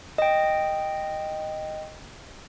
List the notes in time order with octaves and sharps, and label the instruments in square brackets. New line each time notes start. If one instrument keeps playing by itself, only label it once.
[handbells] D#5 G5